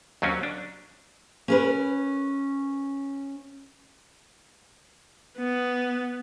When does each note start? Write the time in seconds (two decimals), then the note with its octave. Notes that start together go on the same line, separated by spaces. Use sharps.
0.22 D#2 F#3 C4 C#4
0.43 D4
1.48 C#4 A#4 B4
5.38 B3